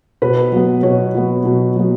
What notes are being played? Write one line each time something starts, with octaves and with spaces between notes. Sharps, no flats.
B2 B4
F#3 B3
B2 C#5
F#3 B3
B2
F#3 B3